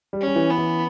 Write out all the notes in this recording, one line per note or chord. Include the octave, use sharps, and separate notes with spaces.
G3
C#4
G3
E3
B3
E3